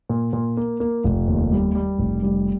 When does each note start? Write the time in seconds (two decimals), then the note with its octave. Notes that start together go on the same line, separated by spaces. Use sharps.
0.09 A#2
0.33 A#2
0.57 A#3
0.80 A#3
1.04 F1
1.28 D#2
1.52 G3
1.75 G3
1.99 F1
2.23 G3